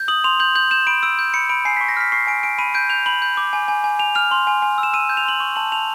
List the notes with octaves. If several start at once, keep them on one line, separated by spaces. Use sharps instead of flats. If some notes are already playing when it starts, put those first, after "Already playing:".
Already playing: G6
D#6 F#7
C6 F7
G6 F#7
G6 F#7
G6 E7
B5 D7
E6 D7
G6
B5 C#7
B5 D7
G#5 C7
C#6 B6
A#6
F6 B6
C#6 C7
G#5 D7
G#5 D7
B5 D#7
G6 D7
G6 F7
B5 F#7
G6
D6
G#5
G#5
G#5
G#5 F7
F6 F7
C6
G#5
G#5
E6
E7
E6 D#7
G6
F7
C6 F#7
C#6
A5 F#7
A5 F7